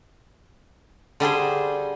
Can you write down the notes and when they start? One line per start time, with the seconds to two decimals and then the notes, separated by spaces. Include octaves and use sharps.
1.20 D3 G3 G#4 C5